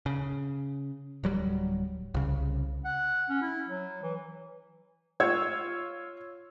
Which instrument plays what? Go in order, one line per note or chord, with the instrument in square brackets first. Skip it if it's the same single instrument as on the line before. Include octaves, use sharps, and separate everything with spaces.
[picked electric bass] C#3
D1 F#3 G3
C2 C#3
[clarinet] F#5
C#4
E4
F#3
E3
[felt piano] F4 C#5 E6 G#6